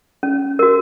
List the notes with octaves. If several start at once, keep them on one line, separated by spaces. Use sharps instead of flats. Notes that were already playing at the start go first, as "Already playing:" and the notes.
C#4
F#4 A#4